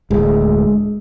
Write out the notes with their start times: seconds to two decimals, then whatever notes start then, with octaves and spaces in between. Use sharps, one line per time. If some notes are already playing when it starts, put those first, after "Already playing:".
0.11 D1 D2 G#3